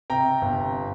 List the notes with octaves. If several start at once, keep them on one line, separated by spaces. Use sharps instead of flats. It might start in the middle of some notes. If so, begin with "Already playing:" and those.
C3 G5 A#5
G1